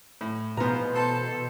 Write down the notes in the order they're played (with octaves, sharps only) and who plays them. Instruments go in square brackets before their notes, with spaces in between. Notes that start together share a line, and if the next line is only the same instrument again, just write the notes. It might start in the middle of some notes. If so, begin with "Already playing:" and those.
[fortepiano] A2
[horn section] G#2 F3 C5 [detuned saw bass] B2 [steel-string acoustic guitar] E3 [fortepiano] B3 A#5
[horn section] A4 C5 A5